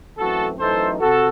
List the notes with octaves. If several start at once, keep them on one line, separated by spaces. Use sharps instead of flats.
F#2 E3 A3 C4 F#4 A4
F#2 E3 A3 D#4 A4 C5
C3 F#4 A4